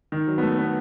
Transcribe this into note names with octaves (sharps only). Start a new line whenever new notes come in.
D#3
F#3
B3
A3
B3